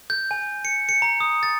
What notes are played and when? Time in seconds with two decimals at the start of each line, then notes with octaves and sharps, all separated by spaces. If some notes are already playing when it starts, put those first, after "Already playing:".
0.10 G6
0.31 G#5
0.65 C#7
0.89 C#7
1.02 A#5
1.20 D#6
1.43 A6